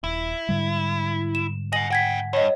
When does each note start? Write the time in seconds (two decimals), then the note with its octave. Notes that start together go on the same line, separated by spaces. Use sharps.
0.04 D#1 E4
0.49 G#2 D3 G3
1.35 E7
1.72 D#5 F#5 G#5 A#6 F#7
1.91 C#3 F#5 G5 G#6 B6
2.33 G2 C#5 D#5